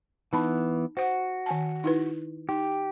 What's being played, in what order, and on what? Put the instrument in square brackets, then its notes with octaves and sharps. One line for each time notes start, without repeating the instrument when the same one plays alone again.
[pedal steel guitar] E3 B3 [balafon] D#4 A5 B5
[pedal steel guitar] F#4 [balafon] C5 F#5
[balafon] D#3 G#5 A5
D#4 E4 B4
[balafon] D#4 [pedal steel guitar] G4